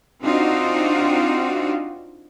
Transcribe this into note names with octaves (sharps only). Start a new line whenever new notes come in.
C4 D4 D#4 F4 F#4